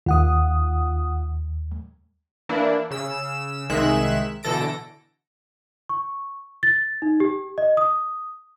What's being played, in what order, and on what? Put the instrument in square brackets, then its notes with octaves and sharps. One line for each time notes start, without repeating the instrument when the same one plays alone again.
[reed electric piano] D#2 [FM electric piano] F4 F#5 D#6
[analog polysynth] E3 A#3 D4 E4
C#3 E6 E7
C2 D#3 G#3 E5 F#6 E7
B2 D3 E3 A4 A#6 D7
[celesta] C#6
A6
D#4
G4
D#5
D#6